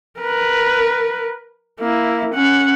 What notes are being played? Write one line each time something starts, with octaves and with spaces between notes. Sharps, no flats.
A#4 B4
A#3 E4
C#4 F#5